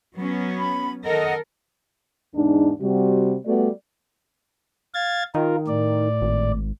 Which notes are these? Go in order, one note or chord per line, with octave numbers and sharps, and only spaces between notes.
F#3 B3 C#4
B5
D#3 A4 A#4 D#5 F#5
E2 G#2 D4 D#4
C3 G3 F#4
G3 A3 B3 F#4 D5
F5 G#6 A6
D#3 F4 A#4
A2 D5
G#1